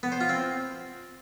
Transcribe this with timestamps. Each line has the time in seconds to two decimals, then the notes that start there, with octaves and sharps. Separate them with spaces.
0.03 B3
0.12 C5
0.21 F4
0.29 C4